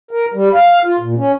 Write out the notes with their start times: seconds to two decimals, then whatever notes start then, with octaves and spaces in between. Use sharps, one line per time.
0.11 A#4
0.34 G3
0.54 F5
0.85 F4
1.00 A#2
1.18 C#4